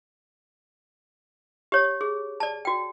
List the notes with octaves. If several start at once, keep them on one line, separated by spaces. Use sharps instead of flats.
G4 C#5
G#4
D5 A5
F#4 G5